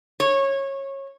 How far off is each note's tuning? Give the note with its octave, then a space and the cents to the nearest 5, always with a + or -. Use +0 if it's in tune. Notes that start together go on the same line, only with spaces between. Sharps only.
C#5 -20